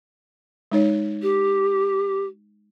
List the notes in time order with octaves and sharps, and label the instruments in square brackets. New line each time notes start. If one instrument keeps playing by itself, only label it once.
[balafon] G#3 D#4 C#5
[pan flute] G4